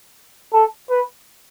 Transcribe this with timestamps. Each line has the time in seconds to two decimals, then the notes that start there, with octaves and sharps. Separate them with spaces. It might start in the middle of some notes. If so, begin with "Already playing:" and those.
0.53 A4
0.90 B4